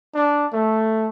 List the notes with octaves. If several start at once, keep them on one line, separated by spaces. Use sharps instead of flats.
D4
A3